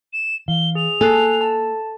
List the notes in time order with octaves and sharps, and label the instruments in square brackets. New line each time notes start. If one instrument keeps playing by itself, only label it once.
[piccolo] E7
[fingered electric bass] E3 [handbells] F5 [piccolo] G7
[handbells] G#4 [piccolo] F7
[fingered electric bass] A#3 [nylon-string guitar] A4 [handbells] G#5 F#6 C7
[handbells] A5